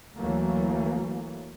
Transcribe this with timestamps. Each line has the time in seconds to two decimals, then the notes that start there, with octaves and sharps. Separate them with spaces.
0.17 D2 E3 F#3 A3 A#3